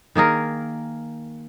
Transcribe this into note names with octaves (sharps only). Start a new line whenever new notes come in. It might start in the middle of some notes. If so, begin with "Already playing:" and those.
D#3 A#3 G#4 A#4